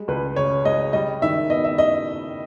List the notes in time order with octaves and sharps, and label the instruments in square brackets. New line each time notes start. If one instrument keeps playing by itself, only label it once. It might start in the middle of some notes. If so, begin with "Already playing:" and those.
Already playing: [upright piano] G3 G#3
C#2 B4
C#3 C#5
G#3 D#5
G3 D#5
D#3 E5
B3 D#5
E5
D#5